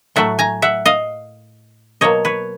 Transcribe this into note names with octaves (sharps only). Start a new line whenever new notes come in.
A2 F#3 A3 E5 F#5
G#5 A#5
E5 F#5
D#5 F5
B2 F#3 A#3 C#5 D#5
B4 C#5